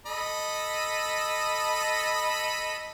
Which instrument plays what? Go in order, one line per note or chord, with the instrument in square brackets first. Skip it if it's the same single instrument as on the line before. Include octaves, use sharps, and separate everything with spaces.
[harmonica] A4 D#5 B5